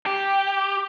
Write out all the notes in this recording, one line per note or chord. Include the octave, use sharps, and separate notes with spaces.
G4